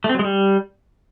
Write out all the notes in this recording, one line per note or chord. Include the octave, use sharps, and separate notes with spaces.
A3
C4
F#3
G#3
G3